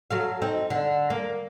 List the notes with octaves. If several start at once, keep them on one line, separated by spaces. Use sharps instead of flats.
F#3 A4 F5
C4 D#4
D3
A#3